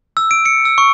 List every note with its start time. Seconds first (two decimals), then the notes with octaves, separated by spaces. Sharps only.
0.17 E6
0.31 D7
0.46 C#7
0.65 E6
0.78 C#6